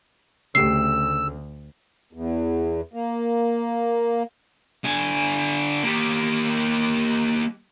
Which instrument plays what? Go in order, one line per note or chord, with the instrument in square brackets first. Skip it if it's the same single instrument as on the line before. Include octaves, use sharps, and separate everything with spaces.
[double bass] D2 [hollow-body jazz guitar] C#3 A3 G4 [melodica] E6 [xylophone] C7
[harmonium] E2
A#3
[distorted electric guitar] D3 G#5
A#3 G4